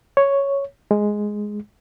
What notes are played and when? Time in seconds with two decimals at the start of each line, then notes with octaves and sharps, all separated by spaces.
0.17 C#5
0.91 G#3